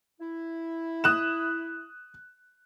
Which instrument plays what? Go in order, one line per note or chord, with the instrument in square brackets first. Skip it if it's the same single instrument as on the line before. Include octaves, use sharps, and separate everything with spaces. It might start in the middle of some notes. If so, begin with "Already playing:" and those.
[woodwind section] E4
[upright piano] D#6 F#6 E7